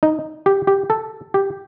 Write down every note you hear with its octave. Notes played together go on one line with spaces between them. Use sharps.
D#4
G4
G4
A4
G4